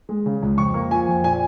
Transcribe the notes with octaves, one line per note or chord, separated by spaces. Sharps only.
G#3
C#3
C#2
F2 C#6
A#3
F3 G#5
F2
A#2 G#5